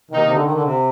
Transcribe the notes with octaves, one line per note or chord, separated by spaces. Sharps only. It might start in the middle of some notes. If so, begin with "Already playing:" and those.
C3 D#3 A#3 D#4
C3
D3
D#3
D3
C3